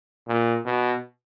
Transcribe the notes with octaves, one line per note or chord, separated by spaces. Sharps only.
A#2
B2